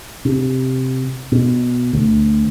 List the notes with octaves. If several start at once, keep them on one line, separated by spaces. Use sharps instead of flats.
C3
B2
D2